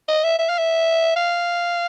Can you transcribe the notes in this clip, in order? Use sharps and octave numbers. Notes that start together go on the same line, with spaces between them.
D#5
E5
E5
F5
E5
F5